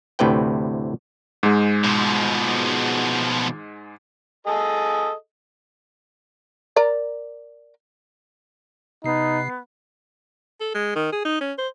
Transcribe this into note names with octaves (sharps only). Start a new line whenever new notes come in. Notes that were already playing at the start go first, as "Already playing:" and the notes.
D2 A2 C3 B4 G5
G#2 G#3
B2 F3
G#4 A4 D#5
A#4 D5 A#5
C3 B3 D#4 C7
A4
G#3
D#3
G#4
D#4
C#4
C5